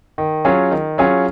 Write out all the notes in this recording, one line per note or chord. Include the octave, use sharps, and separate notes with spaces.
D#3
F#3 C#4 F4 G#4
D#3
F#3 C#4 F4 G#4